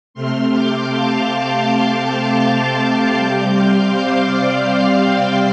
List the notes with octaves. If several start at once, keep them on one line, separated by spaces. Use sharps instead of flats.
C3 A3 C4 C6 F6
D6 G6
F5 A5
A5 D6
C6 F6
D6 G6
F6 A6
C3 G3 C4 D6 G6
C6 F6
C5 F5
D5
C5 F5
D5 G5